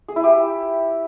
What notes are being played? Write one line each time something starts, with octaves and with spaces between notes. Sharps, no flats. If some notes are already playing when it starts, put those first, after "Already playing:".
G#4
E4
G4